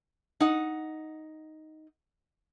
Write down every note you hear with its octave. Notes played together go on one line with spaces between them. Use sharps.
D#4 F#5